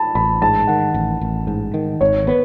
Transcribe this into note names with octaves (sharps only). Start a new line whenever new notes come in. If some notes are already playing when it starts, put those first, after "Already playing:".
Already playing: A5 B5
A1 B5
G#2 A5
D#3 F#5
A1
A1
G#2
D#3
G#1 C#5
B3 B4